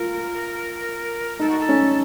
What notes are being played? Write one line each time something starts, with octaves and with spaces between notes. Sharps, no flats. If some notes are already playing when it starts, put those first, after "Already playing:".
Already playing: F4 A#4
D#4 A4
F#4
A4
C#4